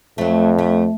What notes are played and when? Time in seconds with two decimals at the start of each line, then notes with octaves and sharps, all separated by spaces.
0.18 F2 F#3 A3
0.58 A3